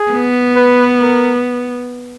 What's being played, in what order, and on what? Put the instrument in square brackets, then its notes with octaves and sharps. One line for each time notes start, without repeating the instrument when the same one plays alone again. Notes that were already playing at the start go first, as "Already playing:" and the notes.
Already playing: [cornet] G#4
[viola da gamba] B3
[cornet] B4
A#4